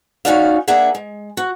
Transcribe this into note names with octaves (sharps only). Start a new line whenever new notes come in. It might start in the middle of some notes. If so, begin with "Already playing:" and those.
D#2 C#4 D#4 F#4 D5 F5
A#3 D4 G#4 E5 F#5
G#3
F#4